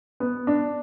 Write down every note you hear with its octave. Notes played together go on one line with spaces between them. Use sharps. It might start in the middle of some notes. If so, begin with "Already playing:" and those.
B3
D4